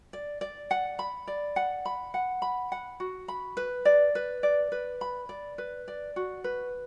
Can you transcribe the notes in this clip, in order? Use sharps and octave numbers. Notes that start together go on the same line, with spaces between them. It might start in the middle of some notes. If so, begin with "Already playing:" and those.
D5
D5
F#5
B5
D5
F#5
B5
F#5
B5
F#5
F#4
B5
B4
D5
B4
D5
B4
B5
D5
B4
D5
F#4
B4